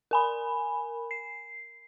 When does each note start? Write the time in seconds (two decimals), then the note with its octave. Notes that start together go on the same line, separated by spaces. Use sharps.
0.11 A#4 G#5 B5
1.11 C7